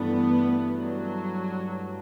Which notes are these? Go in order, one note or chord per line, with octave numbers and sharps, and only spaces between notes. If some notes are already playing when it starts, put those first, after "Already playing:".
Already playing: G2 E3 A3 B3 D4
F#3